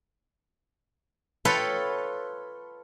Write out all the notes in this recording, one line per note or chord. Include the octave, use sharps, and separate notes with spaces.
F4 A4 B4 C#5 F5 G5